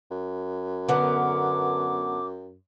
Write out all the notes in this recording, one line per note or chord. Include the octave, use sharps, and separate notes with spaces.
F#2
D3 B3 A#4 D6